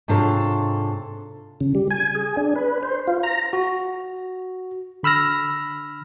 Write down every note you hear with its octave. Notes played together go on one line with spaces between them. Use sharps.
G#2 C3 D4 F4 A4 C#5
C#3
G3
G#5
G#4
D4
B4
C5
F4
A#5
F#4
D3 B5 E6 F6 A#6